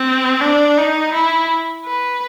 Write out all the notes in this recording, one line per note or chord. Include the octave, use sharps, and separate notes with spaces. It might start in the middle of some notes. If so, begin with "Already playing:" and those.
Already playing: C4
D4
D#4
E4
B4